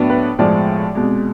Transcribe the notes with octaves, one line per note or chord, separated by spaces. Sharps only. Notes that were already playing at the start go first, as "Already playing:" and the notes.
Already playing: A2 F#3 B3 D4
B4
B1 A2 F3 G#3 D5
C2 B2 G#3